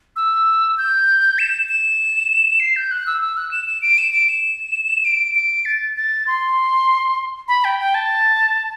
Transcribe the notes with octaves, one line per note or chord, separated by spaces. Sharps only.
E6
G6
E7
E7
C7
G6
F#6
E6
E6
F#6
E7
E7
D7
E7
D7
E7
D7
D7
A6
A6
C6
B5
G5
G5
A5